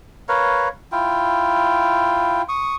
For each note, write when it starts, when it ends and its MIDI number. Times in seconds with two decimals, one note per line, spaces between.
0.29 0.68 70
0.29 0.68 71
0.29 0.68 73
0.29 0.68 77
0.92 2.42 64
0.92 2.42 65
0.92 2.42 79
2.49 2.76 85
2.49 2.76 87